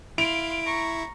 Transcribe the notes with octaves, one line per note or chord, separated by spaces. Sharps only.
E4 F5 C6 D7 F7
A#5 C#6